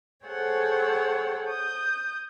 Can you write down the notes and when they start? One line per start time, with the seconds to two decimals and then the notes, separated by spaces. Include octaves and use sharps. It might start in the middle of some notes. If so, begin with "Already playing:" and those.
0.24 G#4 A4 C5 C#5 F#5 G5
1.47 D#6 G6